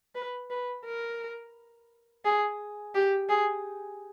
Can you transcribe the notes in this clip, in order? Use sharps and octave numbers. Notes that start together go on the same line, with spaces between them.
B4
B4
A#4
G#4
G4
G#4